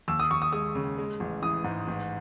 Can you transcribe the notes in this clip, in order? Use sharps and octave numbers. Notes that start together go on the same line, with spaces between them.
D#2 E6
D#6
D#2 C#6
D#6
G#3 D#6
C#3
G#3
A1
E3 D#6
G#2
A1